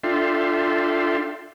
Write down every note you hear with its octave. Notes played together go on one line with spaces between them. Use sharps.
D4 F4 A4 E5 G5 C6